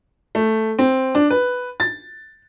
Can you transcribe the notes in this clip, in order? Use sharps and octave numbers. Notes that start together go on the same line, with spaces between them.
A3
C4
D4
B4
A6